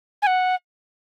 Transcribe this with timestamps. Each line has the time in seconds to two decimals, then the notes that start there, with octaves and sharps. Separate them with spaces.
0.22 G#5
0.27 F#5